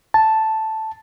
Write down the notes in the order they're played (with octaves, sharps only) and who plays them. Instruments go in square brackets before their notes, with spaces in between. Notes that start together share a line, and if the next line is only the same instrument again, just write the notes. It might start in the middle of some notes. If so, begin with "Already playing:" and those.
[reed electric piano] A5